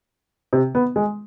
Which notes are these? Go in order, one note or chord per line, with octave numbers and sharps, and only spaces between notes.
C3
B3
G#3